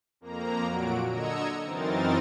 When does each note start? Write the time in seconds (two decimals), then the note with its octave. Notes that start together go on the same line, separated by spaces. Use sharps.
0.21 F2 A#3 A#5
0.65 A#2 F#3 F#4 D7
1.08 D3 D#5 A#5 E6 G#6 C#7
1.64 F#2 E3 C4 D#4 A#4 A6